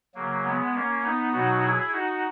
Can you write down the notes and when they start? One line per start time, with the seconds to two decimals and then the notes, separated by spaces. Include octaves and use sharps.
0.15 C#3 F#3 A#3
0.44 G#3 B3
0.74 A#3 C#4
1.03 B3 D#4
1.32 B2 F#3 D#4 F#4
1.62 E4 G#4
1.92 D#4 F#4